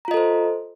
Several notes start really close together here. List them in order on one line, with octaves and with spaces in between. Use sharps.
A#5 F4 D#5 A4 C5